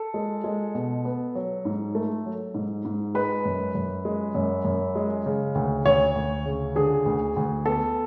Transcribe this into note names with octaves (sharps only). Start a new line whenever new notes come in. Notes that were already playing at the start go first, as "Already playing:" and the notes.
Already playing: A4
G#3
G#3
B2
B3
F#3
G#2
A3
F#3
G#2
G#2
G#3 B4
F#2
F#2
G#3
F#2
F#2
G#3
C#3
D2
D2 C#5
D2
C#3
D3 G#4
D2
D2
B3 A4